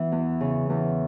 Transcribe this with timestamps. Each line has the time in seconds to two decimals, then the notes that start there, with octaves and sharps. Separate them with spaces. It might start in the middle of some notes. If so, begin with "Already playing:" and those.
Already playing: E3 B3
0.12 E2
0.41 C#3
0.70 E2